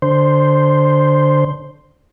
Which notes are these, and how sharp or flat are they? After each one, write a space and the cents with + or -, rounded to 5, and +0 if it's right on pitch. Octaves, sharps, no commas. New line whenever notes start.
D3 +0 C5 +0